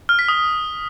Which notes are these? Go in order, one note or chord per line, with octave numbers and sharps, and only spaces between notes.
F6
B6
D#6